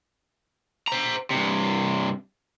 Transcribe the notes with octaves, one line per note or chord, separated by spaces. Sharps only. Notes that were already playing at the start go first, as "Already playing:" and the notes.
C5 A#5
G2 C3